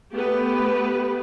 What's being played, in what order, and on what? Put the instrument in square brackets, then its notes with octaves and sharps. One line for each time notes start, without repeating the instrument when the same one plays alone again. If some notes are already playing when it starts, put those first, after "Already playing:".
[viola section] A3 B3 G4 B4